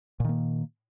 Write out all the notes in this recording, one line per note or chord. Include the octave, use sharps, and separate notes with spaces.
A#2 D#3 A#3